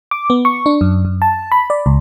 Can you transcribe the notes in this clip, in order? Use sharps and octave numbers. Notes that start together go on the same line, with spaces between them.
D6
B3
C#6
D4
F#2
F#2
A5
B5
D5
C#2